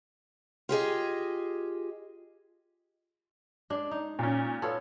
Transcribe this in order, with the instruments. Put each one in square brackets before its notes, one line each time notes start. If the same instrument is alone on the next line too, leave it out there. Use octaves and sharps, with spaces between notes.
[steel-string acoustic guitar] F4 G4 G#4 D#5
[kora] G#3 D4
D#4
[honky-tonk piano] A#2 C#4
[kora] B3 F4 C#5 [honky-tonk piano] A4